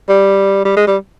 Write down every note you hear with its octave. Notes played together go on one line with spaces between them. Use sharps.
G3
G3
G#3
G3